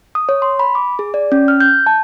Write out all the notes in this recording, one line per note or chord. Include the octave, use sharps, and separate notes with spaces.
D#6
C#5
C6
B5
D6
G#4
D5
C#4
F6
G6
A5